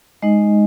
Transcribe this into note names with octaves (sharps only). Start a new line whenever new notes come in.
G#3 D#4 D#5